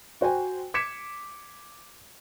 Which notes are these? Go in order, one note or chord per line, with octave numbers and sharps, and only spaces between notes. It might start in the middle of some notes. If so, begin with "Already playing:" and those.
F#4 C5 G5 G#5
D6 G#6 B6 C#7 E7